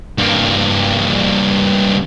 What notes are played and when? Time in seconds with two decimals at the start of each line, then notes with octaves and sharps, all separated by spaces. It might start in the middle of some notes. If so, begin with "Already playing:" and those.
0.18 G2 A#3